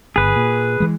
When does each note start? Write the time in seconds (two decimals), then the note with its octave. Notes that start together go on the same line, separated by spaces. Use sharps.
0.16 G1 G#4 B4
0.36 A#2
0.80 E3 G#3